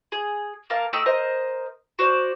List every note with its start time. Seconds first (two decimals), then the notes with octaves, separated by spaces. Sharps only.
0.12 G#4
0.70 A#3 A#4 F5 A5
0.93 A3 D#4 G5 E6
1.06 A#4 C5 D#5
1.99 F#4 C5 D5